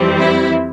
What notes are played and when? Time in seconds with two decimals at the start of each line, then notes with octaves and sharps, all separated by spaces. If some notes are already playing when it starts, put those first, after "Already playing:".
Already playing: F2 E3 G3 C4
0.20 E4